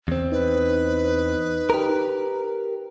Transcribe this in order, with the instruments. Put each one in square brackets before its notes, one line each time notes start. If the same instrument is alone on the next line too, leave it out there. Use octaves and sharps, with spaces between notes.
[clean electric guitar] E2 C4
[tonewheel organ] D#4 [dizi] B4
[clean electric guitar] G4 A#4